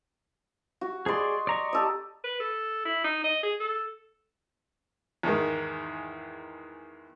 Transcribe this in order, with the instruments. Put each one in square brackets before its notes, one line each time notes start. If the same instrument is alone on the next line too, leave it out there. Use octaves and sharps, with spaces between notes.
[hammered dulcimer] F#4
[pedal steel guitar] G#4 D5 [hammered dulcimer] D#5 C6
[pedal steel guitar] D5 A#5 C#6
[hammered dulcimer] G4 A4 D#5
[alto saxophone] B4
A4
E4
D#4
D#5
G#4
A4
[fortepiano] E2 G#2 D#3